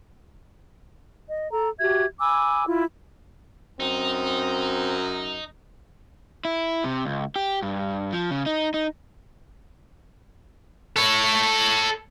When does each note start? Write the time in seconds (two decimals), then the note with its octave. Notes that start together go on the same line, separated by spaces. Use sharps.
1.29 D#5
1.51 A4 A#5
1.79 F#4 G4 E5 G#6
2.19 G#5 B5 D6 E6
2.66 E4 F4
3.80 F#2 C4 D#4
6.45 E4
6.84 C3
7.05 C#2
7.36 G4
7.63 G2
8.12 F3
8.31 C#3
8.46 D#4
8.74 D#4
10.96 A4 C#5